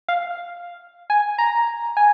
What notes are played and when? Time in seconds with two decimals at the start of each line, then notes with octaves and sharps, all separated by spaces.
0.09 F5
1.10 G#5
1.38 A#5
1.97 G#5